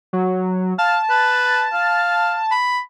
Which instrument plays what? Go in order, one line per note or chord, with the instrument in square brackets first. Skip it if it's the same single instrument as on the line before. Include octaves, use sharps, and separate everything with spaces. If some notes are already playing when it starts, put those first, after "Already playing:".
[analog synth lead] F#3
[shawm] F5 [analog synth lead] A5
[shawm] B4
F5
B5